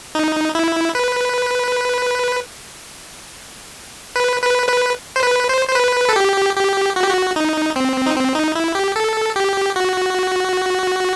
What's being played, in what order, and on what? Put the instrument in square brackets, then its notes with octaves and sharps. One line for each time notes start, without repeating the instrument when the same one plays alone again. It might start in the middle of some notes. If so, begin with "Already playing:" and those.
[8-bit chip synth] D#4
E4
B4
B4
B4
B4
C5
B4
C5
C5
B4
A4
G4
G4
F#4
G4
F#4
D#4
C4
D#4
C4
D#4
E4
G4
A4
G4
F#4